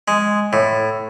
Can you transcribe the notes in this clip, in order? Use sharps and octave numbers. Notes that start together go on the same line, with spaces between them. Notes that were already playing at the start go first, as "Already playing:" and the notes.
G#3
A2